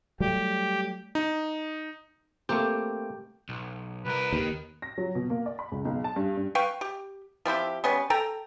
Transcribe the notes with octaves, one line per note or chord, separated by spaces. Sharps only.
F#3 G3 A3 G4
D#4
A3 A#3 C4 G4
B1
C2 A#4 B4
D#2 D#3
A#6
F#3
B2
A#3
D5
B5
C#2
B1
A5
G2
G2
B4 F5 G5 C#6
G4
F3 C4 E4 G4
G3 B3 C#4 B4
A4 G5 A#5